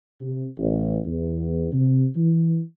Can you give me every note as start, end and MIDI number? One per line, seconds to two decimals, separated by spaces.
0.20 0.47 48
0.58 0.98 33
1.06 1.68 40
1.72 2.06 48
2.16 2.60 52